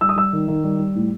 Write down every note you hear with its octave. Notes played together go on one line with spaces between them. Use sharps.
G3 E6
D#6
G3 E6
D#3
D#3
G3
G3
A2